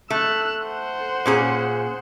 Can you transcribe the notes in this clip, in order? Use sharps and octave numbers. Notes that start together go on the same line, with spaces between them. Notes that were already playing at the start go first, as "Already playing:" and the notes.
A3 E6 F#6
C5 F#5
A#2 C#4 G#4